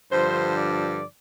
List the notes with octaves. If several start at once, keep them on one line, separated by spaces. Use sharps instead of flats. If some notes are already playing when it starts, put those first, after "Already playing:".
G2 D3 F3 C5
D5